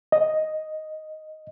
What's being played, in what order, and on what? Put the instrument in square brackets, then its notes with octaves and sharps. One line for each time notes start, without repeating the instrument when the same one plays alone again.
[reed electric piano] D#5